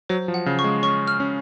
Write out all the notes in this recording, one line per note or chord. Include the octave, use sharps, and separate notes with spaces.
F#3 C5
F3
F#5
C#3
C#6
G#3
C#4 C#6
F6
C#4